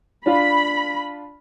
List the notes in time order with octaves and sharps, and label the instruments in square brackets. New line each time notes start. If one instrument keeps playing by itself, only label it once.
[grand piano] D4 F4 F5 [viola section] B5